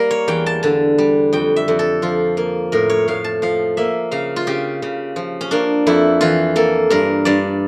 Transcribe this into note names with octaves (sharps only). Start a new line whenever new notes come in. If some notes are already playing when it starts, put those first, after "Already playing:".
Already playing: G3 A#3 A#4
C#5
E2 G5
A5
D3 A5
G3
F2 G5
E5
F2
A4
F3 F4
A#3
A2 A#4
C#5
A2 F5
A5
F3 F5
A#3 E5
C#3 F5
F4
C#3 G4
C#3
F3
C#4
A#3 D4
F2 E4
E3 F4
A#3 A4
G2 A#4
G2 D5